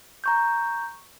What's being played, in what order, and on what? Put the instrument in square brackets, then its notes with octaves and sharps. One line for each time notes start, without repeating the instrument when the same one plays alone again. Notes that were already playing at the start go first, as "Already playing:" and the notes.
[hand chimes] A#5 C#6 G6